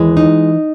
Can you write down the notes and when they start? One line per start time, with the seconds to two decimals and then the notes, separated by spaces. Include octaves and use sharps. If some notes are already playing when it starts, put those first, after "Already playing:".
Already playing: D#2 E3 G#3
0.17 D#4